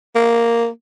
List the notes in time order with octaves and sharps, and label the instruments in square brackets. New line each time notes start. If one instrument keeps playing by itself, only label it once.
[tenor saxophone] A#3